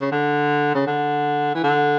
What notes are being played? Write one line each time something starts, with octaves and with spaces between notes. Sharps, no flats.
C#3
D3
C#3
D3
E3
D3